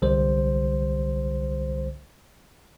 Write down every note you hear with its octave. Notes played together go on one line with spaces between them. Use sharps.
C2 D3 G3 C5